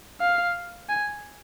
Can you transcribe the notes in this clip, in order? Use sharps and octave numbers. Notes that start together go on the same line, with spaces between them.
F5
G#5